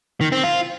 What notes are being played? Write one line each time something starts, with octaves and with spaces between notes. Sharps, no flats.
D#3
C4
F4